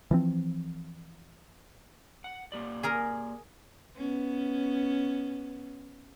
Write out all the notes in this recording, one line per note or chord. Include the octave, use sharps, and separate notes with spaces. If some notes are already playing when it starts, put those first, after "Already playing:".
E3 F3 C4
F#5
A#3 G4 D5
G#4 A#4 A#5
B3 C#4